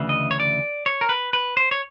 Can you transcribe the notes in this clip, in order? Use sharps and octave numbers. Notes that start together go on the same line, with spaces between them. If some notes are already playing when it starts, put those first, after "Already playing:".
Already playing: D2 C#3 E3
D#5
C#5
D5
C#5
A#4
B4
B4
C5
C#5